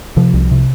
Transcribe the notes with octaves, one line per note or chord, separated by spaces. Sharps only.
C3 F3
C2
C3